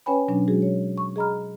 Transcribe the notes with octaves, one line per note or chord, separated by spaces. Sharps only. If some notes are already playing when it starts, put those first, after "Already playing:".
C#4 B4 C#5 G5 G#5 B5
B2 F#3 C#4 D4
F#3 G#3 F#4 G#4
C#5
C#6
G#4 D#5 A#5 B5 F6